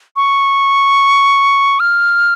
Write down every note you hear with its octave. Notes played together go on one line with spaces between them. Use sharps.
C#6
F6